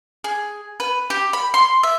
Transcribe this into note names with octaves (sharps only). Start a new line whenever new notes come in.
G#4
B4
G4
B5
C6
E5